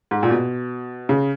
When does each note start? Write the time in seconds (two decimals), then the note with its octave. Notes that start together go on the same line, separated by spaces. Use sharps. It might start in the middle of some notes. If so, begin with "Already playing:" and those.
0.11 G#2
0.23 A#2
0.30 B2
1.09 C#3